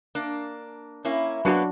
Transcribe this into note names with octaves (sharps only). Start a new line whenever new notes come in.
A#3 D4
A#3 C#4 E4
F#3 A#3 B3 D4 F#4